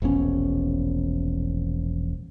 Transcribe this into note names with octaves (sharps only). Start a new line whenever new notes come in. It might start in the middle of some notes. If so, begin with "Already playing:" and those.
E1 A#1 B3 C#4